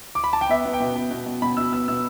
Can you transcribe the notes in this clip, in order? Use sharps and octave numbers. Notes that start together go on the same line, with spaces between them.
D6
B5
A5
G5
B3 E5
B3
G5
B2
B3
B2
B2
B2 B5
B2 E6
B3 E6
B2 E6